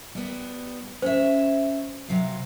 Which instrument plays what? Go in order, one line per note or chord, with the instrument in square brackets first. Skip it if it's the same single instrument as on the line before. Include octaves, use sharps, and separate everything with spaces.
[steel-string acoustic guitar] G3 B3
[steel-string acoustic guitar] C#4 E5 [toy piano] C5
[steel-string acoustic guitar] C3 F#3 F5